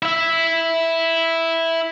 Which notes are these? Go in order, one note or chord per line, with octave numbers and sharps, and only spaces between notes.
E4 E5